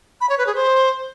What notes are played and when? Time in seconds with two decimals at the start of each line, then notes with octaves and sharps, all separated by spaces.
0.21 B5
0.29 C#5
0.38 B4
0.47 G#4
0.55 C5